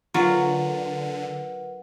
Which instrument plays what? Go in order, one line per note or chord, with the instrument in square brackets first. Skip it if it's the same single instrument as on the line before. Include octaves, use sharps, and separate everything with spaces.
[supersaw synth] D3 [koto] F#3 [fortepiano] F4 [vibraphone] A#4 B4 F#5